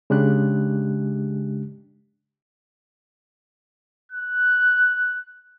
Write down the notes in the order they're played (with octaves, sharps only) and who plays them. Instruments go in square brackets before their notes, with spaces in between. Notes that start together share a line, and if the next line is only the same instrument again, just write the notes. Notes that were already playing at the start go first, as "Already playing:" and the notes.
[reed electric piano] C#3 G#3 D4 G4 F#6
[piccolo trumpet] F#6